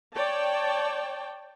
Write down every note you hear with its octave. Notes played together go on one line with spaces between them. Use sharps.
C#5 D5 G5 A5